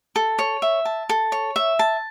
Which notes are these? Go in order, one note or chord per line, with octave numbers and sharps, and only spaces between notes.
A4
C#5
E5
A5
A4
C#5
E5
A5